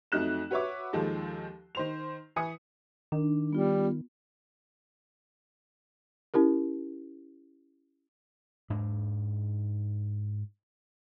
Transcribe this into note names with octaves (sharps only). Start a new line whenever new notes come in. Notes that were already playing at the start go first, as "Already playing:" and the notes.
F2 F#3 A3 D#4 F#6 E7
F#4 B4 C#5 E5 D6
D#2 D#3 F3 G#3 A4
D#3 C5 F7
E3 B4 G#5 D#6 C#7
D#3 D4
G3 B3 F4
C#4 E4 G4 A#4
G#2 D4